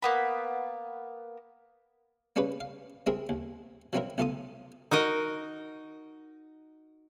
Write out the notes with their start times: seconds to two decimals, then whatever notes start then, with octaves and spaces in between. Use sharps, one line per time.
0.02 A#3 B3 B5
2.36 A#3 C#4 D4 G#4 B4
2.60 F5
3.06 G#3 C4 E4 G#4 A#4
3.29 D#2
3.93 F3 F#3 C4 D#4 E4 A#4
4.18 B1 A3 F4 A4 A5 D#6
4.91 D#4 F#4 A#4 D#5